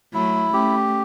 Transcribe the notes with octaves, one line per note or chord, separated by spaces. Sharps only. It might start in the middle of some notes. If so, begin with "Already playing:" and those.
F#3 A3 E4
A3 C#4 G4